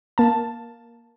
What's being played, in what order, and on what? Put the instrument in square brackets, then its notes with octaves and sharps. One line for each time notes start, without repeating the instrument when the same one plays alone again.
[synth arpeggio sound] A#3 A5